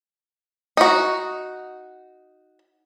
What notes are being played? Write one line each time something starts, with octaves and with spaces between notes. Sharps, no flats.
D#4 F#4